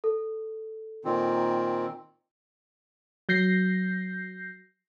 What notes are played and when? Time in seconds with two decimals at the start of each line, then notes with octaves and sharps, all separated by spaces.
0.04 A4
1.05 A#2 D#3 C4
3.29 F#3 G6 A#6 C7